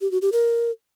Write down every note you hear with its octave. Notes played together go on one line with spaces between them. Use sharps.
G4
F#4
G4
A#4